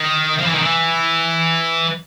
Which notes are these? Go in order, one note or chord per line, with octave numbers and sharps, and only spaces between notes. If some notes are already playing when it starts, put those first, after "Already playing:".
Already playing: D#3
F3
E3
D#3
E3